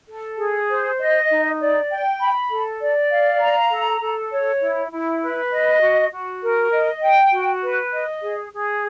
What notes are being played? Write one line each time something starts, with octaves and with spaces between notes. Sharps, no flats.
A4
G#4
C5
D#5
D#4
D5
G5
B5
A4
D5
F5
A#5
A4
A4
C#5
E4
E4
B4
D#5
F#4
F#4
A#4
D#5
G5
F#4
B4
D#5
G#4
G#4